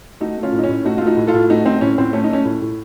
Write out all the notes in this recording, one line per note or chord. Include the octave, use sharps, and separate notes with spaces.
A3 D#4 F#4
A3
C#4 F4
A2
D#4
C#4
A2
A3 D#4 F#4
A3 F4
D#4 F#4
A2
F4 A4
A2
A3 D#4 F#4
A3 C4 D#4
A2 C#4
A2 C4
A3 C#4
D#4
A3 C#4
A2
A2